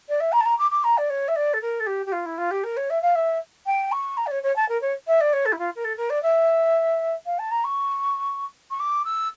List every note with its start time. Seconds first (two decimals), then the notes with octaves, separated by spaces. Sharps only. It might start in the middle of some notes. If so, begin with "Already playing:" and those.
0.08 D5
0.20 E5
0.32 A#5
0.40 A5
0.45 A#5
0.58 D6
0.70 D6
0.84 A#5
0.97 D5
1.09 C#5
1.28 E5
1.36 D5
1.53 A4
1.61 A#4
1.80 A4
1.86 G4
2.06 G4
2.12 F4
2.25 E4
2.37 F4
2.50 G4
2.63 A#4
2.76 C#5
2.90 E5
3.02 F5
3.15 E5
3.66 G5
3.92 C#6
4.17 A#5
4.26 D5
4.31 C#5
4.43 C#5
4.56 A5
4.68 A#4
4.81 C#5
5.07 E5
5.20 D5
5.33 C#5
5.45 A4
5.52 E4
5.58 F4
5.75 A#4
5.84 A4
5.97 A#4
6.10 D5
6.22 E5
7.26 F5
7.38 A5
7.51 A#5
7.64 C#6
8.70 C#6
8.79 D6
9.05 E6